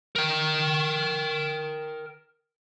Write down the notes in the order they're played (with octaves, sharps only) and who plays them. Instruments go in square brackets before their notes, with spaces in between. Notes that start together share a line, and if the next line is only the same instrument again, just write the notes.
[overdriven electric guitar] A#4 G5